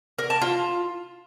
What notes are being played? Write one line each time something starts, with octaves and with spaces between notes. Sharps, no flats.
A#4
A5
F4